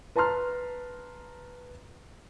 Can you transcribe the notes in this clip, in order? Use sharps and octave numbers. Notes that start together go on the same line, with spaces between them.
B4 A5 A#5 C6 F6